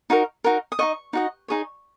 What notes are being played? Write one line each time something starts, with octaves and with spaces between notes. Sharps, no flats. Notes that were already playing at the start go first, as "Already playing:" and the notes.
D#4 F#4 A#4
D#4 F#4 A#4
D#6
D#4 F#4 D#5 C#6
D#4 F#4 D#5
D#4 G#4 C#5